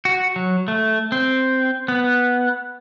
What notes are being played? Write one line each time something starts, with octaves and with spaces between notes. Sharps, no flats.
F#4
F#3
A3
C4
B3